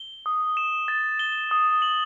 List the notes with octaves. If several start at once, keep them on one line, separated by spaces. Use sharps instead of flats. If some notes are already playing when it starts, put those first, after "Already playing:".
Already playing: G7
D#6
E7
A6
G7
D#6
F#7